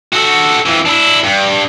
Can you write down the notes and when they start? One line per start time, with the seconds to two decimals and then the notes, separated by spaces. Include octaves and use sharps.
0.13 F#4 A4
0.66 F2 E3
0.86 D4 E4
1.24 G2